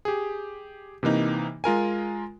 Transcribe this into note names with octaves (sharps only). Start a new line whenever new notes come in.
G4 G#4
C3 E3 A#3 D#4
G#3 F4 A#4 G#5